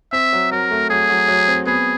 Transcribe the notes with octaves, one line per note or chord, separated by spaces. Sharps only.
C4 E5
F#3
F#3 A#4
A3
F#3 G#4
F#3
F#3
C4
B3 G#4